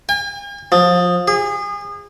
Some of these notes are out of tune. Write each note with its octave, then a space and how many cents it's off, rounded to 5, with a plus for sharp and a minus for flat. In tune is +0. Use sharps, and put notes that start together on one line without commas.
G#5 -45
F3 +25
G#4 -30